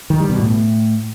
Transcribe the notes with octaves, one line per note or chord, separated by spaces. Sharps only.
D#3
G3
B2
A2